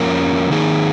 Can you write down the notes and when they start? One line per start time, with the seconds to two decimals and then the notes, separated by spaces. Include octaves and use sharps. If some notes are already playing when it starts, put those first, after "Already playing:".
Already playing: F2 F3 A#3 C#4 A#4
0.51 D#3 A#3 D#4 G#4